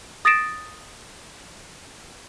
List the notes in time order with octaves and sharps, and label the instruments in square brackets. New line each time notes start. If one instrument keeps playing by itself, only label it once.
[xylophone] D#6 A6 A#6 C7 D7 E7